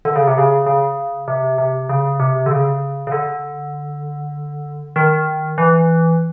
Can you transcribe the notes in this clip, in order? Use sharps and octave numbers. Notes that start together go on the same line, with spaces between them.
D3
C#3
C3
C#3
C#3
C3
C3
C#3
C3
D3
C#3
C#3
D3
D#3
E3